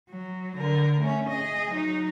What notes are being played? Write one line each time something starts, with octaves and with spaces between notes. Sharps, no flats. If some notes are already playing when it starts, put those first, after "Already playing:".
F#3
D3 A#4
A3 C#4
G#4 D#5
F#3 D#4